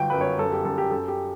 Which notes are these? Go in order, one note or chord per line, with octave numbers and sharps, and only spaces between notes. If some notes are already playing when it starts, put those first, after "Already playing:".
Already playing: G1 F#3 G5
F#2 B4
C#5
F#2 A4
G4
F#2 A4
G4
F#2 A4
G4